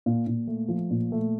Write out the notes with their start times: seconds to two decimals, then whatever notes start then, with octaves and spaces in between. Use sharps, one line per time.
0.06 A#2
0.27 A#2
0.47 A3
0.68 F3
0.91 A#2
1.12 A3